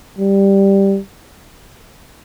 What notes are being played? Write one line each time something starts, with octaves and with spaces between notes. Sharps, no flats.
G3